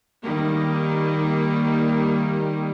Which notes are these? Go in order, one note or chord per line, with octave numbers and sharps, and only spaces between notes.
D#3 G3 A#3